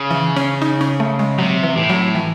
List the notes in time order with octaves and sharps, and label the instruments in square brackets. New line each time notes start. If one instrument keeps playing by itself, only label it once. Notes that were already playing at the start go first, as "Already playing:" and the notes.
Already playing: [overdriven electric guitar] C#3
[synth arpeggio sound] E3
C#4
D#4
C#4
A3
G#3
[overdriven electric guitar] C3 [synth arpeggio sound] F#3
[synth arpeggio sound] E3
[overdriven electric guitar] A2
[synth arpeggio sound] F#3
E3